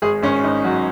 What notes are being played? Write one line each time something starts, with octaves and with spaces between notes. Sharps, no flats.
G#1 G#4
G#1 C#4
G#1 D#4
F#3 F#4